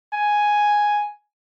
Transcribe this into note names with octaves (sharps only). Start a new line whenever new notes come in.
G#5